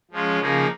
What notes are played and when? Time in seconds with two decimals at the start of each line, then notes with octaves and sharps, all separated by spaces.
0.11 F3 G#3 C#4 F4
0.39 C#3 F3 A#3 D#4 G#4